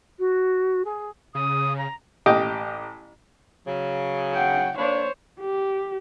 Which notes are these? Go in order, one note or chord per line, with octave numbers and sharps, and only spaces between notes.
F#4
G#4
C#3 D#6
A#5
A1 G4 D#5 G5 D6
C#3 F#3
F#5 G5
A#3 D4 C5 C#5
G4